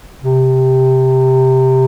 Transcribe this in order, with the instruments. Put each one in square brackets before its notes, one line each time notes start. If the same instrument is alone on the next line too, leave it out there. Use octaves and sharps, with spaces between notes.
[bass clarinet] C3